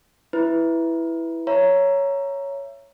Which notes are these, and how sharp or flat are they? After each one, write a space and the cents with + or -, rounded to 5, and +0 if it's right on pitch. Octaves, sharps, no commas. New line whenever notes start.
E4 +0 B4 +0
C#5 +5 E5 +25 A#5 +0